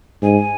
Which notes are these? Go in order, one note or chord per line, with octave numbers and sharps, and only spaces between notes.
G#2 G#5